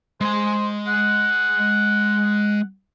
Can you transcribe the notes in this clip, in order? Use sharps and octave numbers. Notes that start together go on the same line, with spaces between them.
G#3 C5 G#5
F#5